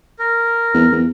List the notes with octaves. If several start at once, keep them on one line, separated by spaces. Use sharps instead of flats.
A#4
E2
E2